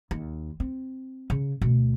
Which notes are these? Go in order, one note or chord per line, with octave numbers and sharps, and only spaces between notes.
D#2
C4
C#3
D2 B2